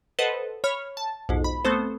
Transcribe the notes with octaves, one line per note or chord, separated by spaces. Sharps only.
A4 B4 C5 D#5 F#5
C#5 B5 F6
A5
B1 F2 G#2
B5
A3 B3 C4 A4 C5